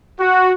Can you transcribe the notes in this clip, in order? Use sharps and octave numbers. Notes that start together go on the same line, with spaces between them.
F#4